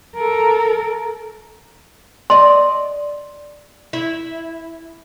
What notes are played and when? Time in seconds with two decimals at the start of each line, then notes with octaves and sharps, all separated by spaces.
0.16 A4 A#4
2.30 D5 D#5 C6
3.93 E4